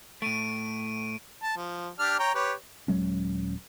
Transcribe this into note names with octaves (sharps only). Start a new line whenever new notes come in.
A2 A3 D7 D#7
A5
F3
D4 G4 F6
C#5 G5 A#5
G4 B4 C#5
D#1 F#3 G#3 C#4